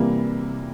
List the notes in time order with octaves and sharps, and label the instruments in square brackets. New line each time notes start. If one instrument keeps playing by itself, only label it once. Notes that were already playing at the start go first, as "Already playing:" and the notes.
Already playing: [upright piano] C3 E3 G3 A#3